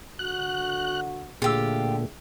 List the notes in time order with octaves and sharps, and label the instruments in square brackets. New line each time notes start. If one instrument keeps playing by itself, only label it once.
[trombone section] D3 F#4 [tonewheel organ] F#6
[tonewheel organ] A#2 [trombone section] D3 A3 [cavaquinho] F4 G4 [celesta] G#4 G5 E6